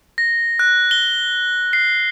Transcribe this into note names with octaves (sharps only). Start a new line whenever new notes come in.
A#6
F#6
G7
C7